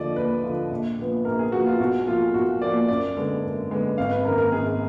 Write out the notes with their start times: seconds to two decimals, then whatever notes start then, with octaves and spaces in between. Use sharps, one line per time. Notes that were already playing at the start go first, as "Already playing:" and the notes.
Already playing: D#2 D3 F3 D5 D#5
0.16 D#2 B4
0.44 D3 F3
0.71 A#1
0.98 A#2 F3 B3
1.25 A#1 A#4
1.39 G#4
1.52 A#2 F3 B3 F#4
1.66 F4
1.80 B1 F#4
2.07 A#2 F3 A#3 F4
2.34 B1 F#4
2.61 A#2 F3 A#3 D5
2.88 F#2 D5
3.16 D3 G#3 B3
3.43 F#2
3.71 D3 G#3 B3
3.98 G#1 F5
4.11 B4
4.25 F#2 D#3 A#3 A#4
4.38 A#4
4.52 G#1 G#4